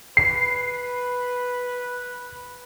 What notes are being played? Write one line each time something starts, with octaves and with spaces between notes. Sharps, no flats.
B4 C7